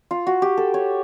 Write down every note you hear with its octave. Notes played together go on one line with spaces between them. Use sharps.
F4
F#4
G4
A4
C#5